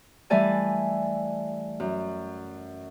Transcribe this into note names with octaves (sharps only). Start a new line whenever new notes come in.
E3 G3 A3 D5 G#5 A5
F#2